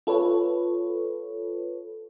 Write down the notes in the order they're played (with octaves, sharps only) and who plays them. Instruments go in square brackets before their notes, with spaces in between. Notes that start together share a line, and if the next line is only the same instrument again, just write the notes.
[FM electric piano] F4 A4 B4 C#5